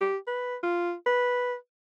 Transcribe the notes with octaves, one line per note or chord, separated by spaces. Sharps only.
G4
B4
F4
B4